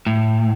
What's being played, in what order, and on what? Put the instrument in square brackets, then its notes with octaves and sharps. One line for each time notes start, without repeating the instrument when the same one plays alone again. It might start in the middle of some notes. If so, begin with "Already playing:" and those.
[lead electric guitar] A2